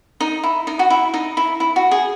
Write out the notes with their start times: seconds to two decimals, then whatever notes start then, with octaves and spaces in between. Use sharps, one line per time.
0.20 D#4
0.43 E4
0.67 D#4
0.79 F#4
0.90 E4
1.14 D#4
1.37 E4
1.60 E4
1.76 F#4
1.91 G#4